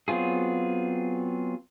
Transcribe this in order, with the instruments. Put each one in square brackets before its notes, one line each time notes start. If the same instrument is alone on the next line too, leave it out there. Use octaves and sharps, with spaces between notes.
[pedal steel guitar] F#3 B3 C4 F4 G#4